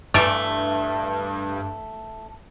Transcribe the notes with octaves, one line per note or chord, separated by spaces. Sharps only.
G2 E3 A3 D5